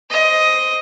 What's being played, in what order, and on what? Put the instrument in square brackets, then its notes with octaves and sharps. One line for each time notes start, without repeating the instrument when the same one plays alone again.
[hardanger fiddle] C5 D#5